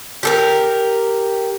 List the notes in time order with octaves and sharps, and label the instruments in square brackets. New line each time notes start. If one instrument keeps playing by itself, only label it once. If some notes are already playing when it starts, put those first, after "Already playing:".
[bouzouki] G4 A4 A#4